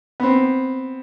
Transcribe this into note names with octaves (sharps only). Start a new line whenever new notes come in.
B3 C4